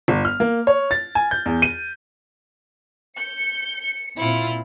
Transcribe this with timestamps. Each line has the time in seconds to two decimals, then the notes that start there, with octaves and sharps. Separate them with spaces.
0.08 G1
0.25 F6
0.40 A#3
0.67 C#5
0.91 A6
1.15 G#5
1.31 G6
1.46 E2
1.62 D#7
3.17 G6 C#7
4.17 A#2 C4 E4 F4